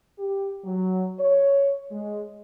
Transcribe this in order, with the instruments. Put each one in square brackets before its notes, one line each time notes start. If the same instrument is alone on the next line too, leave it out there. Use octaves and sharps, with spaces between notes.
[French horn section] G4
F#3
C#5
G#3